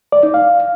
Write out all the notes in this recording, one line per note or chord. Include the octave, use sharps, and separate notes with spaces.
D5
D#4
F5